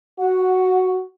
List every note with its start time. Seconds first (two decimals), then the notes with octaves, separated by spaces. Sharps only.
0.19 F#4 F#5